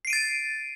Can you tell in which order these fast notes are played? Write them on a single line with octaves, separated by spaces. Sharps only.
C7 D7 D#7 A6